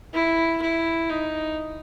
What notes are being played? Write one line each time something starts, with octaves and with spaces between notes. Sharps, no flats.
E4
E4
D#4